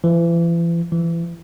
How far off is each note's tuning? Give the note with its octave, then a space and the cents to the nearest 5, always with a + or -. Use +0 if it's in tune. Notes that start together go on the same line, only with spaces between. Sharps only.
E3 +40
E3 +30